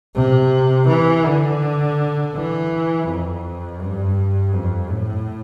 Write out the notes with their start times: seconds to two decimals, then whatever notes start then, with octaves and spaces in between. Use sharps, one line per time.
0.15 C3
0.88 E3
1.25 D3
2.35 E3
3.07 F2
3.81 G2
4.54 F2
4.90 A2